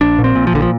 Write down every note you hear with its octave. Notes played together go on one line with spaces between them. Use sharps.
A#1 D4
A#2
C4
A#2
F3
A#1 D3
F3